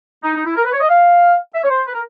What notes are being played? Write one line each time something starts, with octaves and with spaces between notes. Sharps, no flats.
D#4
D#4
E4
A#4
B4
C#5
D#5
F5
E5
C#5
C5
B4
A#4